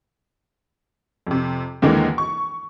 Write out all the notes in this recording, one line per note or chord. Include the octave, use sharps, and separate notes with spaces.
F2 C3
D#2 D3 E3 G#3 A#3
C#6